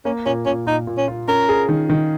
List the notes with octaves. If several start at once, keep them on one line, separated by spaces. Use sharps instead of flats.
A#3 C#4
A#2 C#4
A#2 C#4
A#2 D#4
A#2
C#4
F4
C#4 A#4
G#4
D#3
D#3